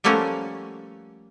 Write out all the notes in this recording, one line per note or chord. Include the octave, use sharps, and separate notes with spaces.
F3 G3 A3 A#3 C#4 F#4